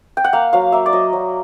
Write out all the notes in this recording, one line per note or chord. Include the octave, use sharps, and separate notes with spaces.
G5
F#5
A#3 F5
F#3 F5
A#3 E5
D5
F#3 D#5
F#3